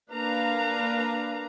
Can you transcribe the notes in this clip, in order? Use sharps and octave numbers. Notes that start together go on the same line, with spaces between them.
A#3 D4 B4 F5 A#5